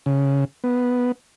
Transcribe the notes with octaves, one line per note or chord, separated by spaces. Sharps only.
C#3
B3